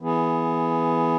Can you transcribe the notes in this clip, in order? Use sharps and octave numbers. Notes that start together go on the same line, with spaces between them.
E3 B3 G#4